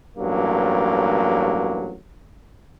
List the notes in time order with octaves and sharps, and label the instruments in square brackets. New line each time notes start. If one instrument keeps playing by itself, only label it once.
[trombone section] A1 G2 F#3 A#3